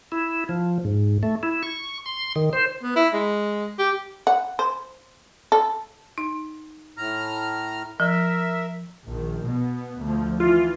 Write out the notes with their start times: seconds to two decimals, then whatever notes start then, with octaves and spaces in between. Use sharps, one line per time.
0.12 E4
0.49 F3
0.85 G#2
1.23 A3
1.43 E4
1.63 C#6
2.06 C6
2.36 D#3
2.53 C5
2.83 B3
2.96 E4
3.13 G#3
3.79 G4
4.27 F#5
4.59 C5
5.52 A4
6.18 D#4
6.97 A2 A#5 F6
8.00 F3 A#4 E5
9.07 A#1 D#3
9.47 B2 B3
10.00 D2 F3
10.40 E3 F4